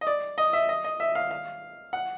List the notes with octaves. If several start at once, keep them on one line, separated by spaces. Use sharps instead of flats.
D#5
D5
D#5
E5
D#5
D#5
E5
F5
F5
F#5